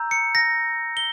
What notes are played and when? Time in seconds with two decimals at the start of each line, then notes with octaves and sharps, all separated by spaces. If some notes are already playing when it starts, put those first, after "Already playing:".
Already playing: A#5 E6 G6
0.11 C#7
0.35 A#6
0.97 G7